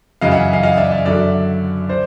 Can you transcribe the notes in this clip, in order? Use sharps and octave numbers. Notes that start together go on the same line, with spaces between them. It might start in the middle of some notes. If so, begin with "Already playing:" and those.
F#2 C#3 E3 D#5 F5
E5 F#5
D#5 F5
D#5 F5
D5 E5
D5 E5
F#2 D3 F#3 D5 E5
C5 D5